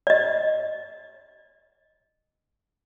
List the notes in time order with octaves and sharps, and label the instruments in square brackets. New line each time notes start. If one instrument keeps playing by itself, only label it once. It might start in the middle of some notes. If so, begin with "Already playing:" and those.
[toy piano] D5 D#5